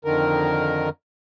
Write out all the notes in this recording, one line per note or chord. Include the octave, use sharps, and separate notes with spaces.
F2 D3 D#3 A#4